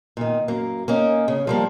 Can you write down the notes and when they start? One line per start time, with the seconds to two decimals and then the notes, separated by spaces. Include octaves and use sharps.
0.17 A#2 D#3
0.48 F#2 A#3
0.88 A#3 C#4 D#4
1.28 C#3
1.47 F3 G3 A#3